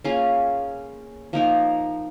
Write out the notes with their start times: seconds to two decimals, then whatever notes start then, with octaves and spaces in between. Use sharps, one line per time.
0.04 A#3 C#4 F4 G#4
1.33 F3 A#3 D#4 A#4